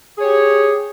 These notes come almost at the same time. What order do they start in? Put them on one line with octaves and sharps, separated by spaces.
G#4 C#5 G4